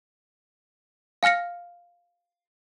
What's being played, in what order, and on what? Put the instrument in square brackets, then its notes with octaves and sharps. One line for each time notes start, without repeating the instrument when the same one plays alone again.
[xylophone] F5 G#5 F6 A#6 C#7